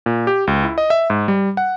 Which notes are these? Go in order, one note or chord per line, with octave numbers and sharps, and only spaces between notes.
A#2
G4
C#2
E4
D#5
E5
G#2
G3
F#5